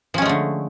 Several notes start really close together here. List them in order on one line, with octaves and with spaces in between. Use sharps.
F3 C#4 G#3 A3 D3